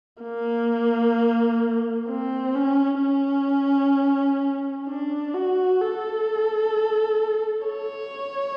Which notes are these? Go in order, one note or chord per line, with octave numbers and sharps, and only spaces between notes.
A#3
C4
C#4
C#4
D4
F#4
A4
C#5